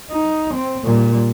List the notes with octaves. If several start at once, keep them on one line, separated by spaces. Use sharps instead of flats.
D#4
C4
A#2 G3